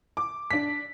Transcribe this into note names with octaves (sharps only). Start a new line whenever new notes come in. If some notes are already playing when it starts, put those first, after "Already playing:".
D6
D4 B6